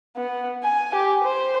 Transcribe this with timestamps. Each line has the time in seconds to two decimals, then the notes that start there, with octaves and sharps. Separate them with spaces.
0.17 B3
0.64 G#5
0.95 G4
1.24 C5